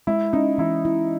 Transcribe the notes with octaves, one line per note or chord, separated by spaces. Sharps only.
G#3 E4
C#4 D#4
E3 E4
E4